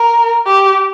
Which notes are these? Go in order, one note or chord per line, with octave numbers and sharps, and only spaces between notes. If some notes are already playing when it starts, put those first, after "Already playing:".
Already playing: A#4
G4